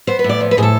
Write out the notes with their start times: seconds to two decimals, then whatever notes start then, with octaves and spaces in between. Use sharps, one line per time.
0.07 B3 C5
0.19 B4
0.24 A2
0.29 D5
0.41 F3
0.51 B4
0.57 A2 G#4
0.63 A4